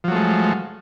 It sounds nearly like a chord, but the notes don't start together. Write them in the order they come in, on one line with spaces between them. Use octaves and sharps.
F3 F#3 A3 G#3